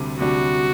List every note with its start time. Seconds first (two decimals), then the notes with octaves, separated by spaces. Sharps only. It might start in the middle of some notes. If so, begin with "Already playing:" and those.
Already playing: D2 C3 G3 D4
0.18 D2 C3 G3 D4 F#4